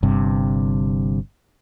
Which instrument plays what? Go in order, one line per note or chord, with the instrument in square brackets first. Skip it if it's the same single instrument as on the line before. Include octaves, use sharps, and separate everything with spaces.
[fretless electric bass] G1 G2 C3